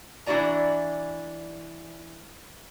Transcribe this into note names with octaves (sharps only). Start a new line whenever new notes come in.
E3 D4 E4 F#4 D5 A#5